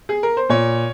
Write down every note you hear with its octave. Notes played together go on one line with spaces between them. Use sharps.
G#4
A#4
C5
A#2 C#5